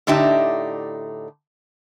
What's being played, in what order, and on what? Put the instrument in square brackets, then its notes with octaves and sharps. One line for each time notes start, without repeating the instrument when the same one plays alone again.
[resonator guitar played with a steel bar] A2 D3 D4 D#4 G4 E5